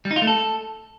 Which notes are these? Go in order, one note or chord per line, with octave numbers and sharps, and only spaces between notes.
G3
D#4
F4
A3
A4